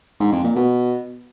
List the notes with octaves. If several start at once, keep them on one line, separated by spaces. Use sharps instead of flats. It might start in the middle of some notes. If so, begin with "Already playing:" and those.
G#2
F2
A#2
B2